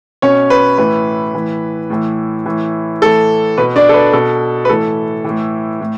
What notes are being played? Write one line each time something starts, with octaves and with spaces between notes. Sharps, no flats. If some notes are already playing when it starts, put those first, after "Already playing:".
B2 C#4 C#5
B4
A2 E3 B4
A2 E3
A2 E3
A2 E3
A2 E3 A4
B2 B4
D4 D5
A4
B4
B2 A4
B4
A2 E3 A4
A2 E3
A2